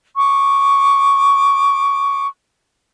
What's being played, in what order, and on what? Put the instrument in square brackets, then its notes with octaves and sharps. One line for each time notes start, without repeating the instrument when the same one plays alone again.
[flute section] C#6 D6